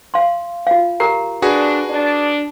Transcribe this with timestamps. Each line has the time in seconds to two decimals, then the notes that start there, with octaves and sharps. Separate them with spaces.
0.14 F5 C6
0.67 F4 F5
1.00 G4 A#4 A#5 C7
1.42 D4 F#4 G#4 B4
1.90 D4